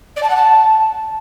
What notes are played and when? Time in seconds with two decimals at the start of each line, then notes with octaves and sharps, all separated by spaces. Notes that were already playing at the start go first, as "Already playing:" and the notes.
0.16 D5
0.23 A5
0.29 F#5
0.36 A5